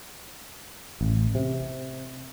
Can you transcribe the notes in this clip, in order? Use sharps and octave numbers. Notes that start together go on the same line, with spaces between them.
A1
C3